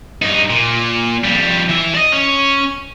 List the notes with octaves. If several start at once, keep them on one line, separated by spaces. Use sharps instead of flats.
G2 D#4
A#2
F2 G3
E3 E5
D5 D#5
C#4